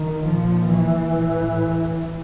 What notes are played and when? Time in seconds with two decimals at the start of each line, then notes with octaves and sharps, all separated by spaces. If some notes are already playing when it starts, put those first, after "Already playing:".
Already playing: D#3
0.25 A#2 F3
0.70 E3
1.15 A2